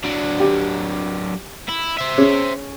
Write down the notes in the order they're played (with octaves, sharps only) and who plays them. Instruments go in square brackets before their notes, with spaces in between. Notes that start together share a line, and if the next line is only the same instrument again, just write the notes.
[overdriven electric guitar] F#3 D4
[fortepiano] G4
[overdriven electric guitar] E4
C5 E5
[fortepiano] C#4 G#4